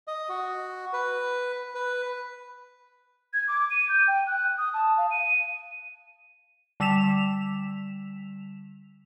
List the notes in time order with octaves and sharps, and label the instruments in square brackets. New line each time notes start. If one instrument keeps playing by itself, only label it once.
[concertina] D#5
F#4
B4
B4
[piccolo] G#6
D6
D#7
G6
G5
F#6
D#6
A5
F5
D#7
[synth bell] D3 G3 E6 B6 E7 F7